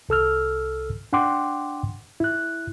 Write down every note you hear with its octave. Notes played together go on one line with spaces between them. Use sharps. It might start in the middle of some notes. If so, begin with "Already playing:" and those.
C2 A4 E6 F6
D4 F#5 G5 C6 D6
E4 F#6